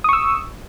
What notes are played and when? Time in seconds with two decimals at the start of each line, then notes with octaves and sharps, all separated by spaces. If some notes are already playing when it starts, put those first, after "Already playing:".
0.04 D#6
0.09 C#6
0.13 E6